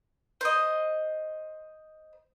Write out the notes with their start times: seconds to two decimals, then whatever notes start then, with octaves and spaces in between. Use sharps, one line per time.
0.41 C5 D#5